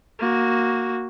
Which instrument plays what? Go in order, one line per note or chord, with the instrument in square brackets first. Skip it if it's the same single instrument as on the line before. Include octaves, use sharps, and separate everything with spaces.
[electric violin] A#3 F#4